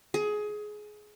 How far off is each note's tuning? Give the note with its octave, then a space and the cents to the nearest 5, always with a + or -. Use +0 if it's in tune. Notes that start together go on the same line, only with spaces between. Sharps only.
G#4 +20